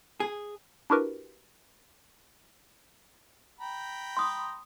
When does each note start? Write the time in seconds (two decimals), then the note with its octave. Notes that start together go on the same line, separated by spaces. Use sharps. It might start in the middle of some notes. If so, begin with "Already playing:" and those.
0.20 G#4
0.90 D4 E4 F#4 G4 A#4 B4
3.60 G5 A#5 B5
4.17 C6 D#6